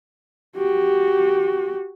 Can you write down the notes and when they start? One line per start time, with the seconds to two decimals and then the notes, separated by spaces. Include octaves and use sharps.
0.56 F#4 G4